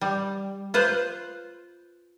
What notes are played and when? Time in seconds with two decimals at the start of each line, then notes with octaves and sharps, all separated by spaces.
0.01 G3
0.74 F4 B4 C5